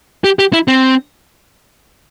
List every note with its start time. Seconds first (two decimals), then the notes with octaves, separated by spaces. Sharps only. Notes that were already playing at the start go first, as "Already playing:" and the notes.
0.24 G4
0.39 G4
0.53 E4
0.68 C4